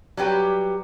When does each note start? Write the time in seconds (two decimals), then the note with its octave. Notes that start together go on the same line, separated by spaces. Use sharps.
0.17 F#3 G3 G4 B4